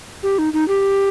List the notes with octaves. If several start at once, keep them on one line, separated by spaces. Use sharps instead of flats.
G4
D#4
D#4
G4